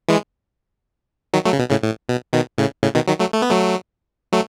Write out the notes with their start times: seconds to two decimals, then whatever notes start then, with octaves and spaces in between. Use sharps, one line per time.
0.08 E3 G#3
1.33 D#3 F#3
1.45 F#3 A3
1.53 C#3
1.59 B2
1.71 A2 C#3
1.83 A2
2.09 B2
2.33 B2 D#3
2.58 A2 C#3
2.83 A2 C#3
2.95 B2 D#3
3.08 D#3 F#3
3.20 F#3 A3
3.33 A3
3.42 B3
3.50 F#3 A3
4.32 F#3 A3